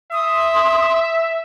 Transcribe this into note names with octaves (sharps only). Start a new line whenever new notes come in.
E5 C6 D#6